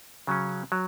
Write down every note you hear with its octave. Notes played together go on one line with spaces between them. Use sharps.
C#3 F#3 C#4
F#3